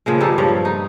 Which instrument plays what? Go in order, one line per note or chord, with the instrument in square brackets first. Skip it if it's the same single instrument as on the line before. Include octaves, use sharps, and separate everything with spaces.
[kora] A#2 C#3 F3 G#3
G2 G3 D#4 A4
G2 F3 C#5
D#4